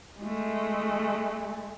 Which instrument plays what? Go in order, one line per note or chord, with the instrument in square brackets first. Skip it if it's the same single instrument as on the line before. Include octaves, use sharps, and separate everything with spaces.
[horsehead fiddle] G#3 A3